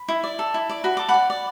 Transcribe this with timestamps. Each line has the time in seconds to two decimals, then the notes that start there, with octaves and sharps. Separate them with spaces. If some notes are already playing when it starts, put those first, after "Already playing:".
Already playing: B5
0.08 E4
0.24 D5
0.39 A4
0.54 E4
0.69 D5
0.84 F#4 B5
0.97 A4 D6
1.08 F#5 B5
1.14 D5
1.30 D5